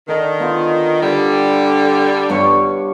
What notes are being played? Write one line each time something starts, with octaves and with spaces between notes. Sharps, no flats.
D3 D#3
B3 F4
D3 G3
G2 B3 C#5